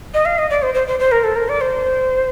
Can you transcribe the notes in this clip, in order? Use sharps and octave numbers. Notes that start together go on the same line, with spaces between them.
D#5
F5
D#5
D5
C5
C5
C5
C5
A#4
A4
A#4
D5
C5